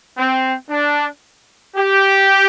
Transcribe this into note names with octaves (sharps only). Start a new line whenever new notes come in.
C4
D4
G4